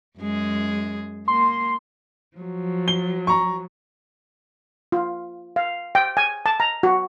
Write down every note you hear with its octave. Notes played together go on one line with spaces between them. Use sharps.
F#2 G#3 G#4
A#3 C6
F3 F#3
G7
A#5 C#6
F4
F5
G5
G#5
A5
A#5
F#4